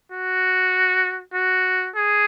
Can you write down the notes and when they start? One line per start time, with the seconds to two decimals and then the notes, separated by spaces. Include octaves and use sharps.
0.12 F#4
1.34 F#4
1.96 G#4